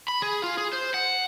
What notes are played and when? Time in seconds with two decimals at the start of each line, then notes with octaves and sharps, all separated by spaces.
0.08 B5
0.22 G#4
0.43 F4
0.57 G#4
0.73 C5
0.94 F#5